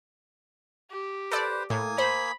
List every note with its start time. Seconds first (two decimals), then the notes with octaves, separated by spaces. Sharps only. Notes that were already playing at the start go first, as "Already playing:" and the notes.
0.91 G4
1.32 A4 B4 C5 D5
1.70 A2 A#3 G#5 D#6
1.98 C5 B5